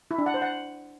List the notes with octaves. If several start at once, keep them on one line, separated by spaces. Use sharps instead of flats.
E4
D4
F#5
C5
F#5